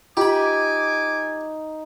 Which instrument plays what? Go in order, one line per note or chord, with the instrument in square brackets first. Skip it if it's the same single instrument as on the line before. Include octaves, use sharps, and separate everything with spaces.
[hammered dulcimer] D#4 [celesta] F4 [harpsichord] G4 B5 [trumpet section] G#5 D6